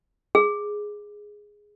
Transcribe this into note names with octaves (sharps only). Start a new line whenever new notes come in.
G#4